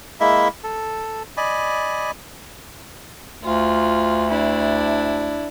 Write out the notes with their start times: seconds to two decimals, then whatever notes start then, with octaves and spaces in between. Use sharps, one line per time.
0.20 G#3 A#3 E4 E5
0.64 A4
1.37 D5 D#5 G#5 B5
3.43 D2 F4
4.30 D4 E4